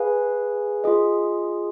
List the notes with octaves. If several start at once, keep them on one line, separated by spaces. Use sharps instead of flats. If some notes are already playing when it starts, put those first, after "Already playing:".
Already playing: G#4 B4 F5 G#5
F4 G#4 D#5